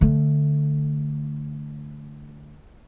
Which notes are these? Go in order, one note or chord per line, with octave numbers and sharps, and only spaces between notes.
D3 A3